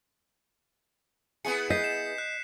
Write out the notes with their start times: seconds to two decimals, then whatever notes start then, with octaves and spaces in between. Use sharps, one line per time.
1.45 B3 E4 G#4 C#7
1.70 D#5 G6 B6 C7
1.84 E7
2.18 F#6